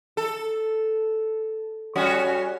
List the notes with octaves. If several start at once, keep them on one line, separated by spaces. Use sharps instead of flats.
A4
G3 C#4 F#4